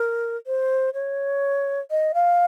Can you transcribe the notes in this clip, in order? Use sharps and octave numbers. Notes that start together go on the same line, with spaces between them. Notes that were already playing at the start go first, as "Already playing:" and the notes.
Already playing: A#4
C5
C#5
D#5
F5